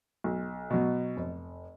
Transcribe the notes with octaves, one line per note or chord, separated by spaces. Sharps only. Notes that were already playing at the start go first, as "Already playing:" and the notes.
B1
B2 F#3
F1